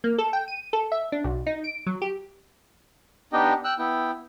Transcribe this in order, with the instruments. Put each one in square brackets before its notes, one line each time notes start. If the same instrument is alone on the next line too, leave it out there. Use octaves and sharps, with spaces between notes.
[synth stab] A#3
A4
G5
D#7
A4
E5
D4
B1
D#4
D7
F#3
G4
[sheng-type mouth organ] B3 D4 D#4 G4 D#5 G5
G5 E6 F#6
B3 E4 G5